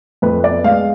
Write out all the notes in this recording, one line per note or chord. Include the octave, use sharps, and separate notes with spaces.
F2 B4
B3 D5
G#3 F5